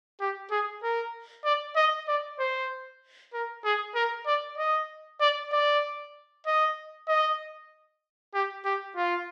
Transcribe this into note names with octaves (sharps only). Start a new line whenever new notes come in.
G4
G#4
A#4
D5
D#5
D5
C5
A#4
G#4
A#4
D5
D#5
D5
D5
D#5
D#5
G4
G4
F4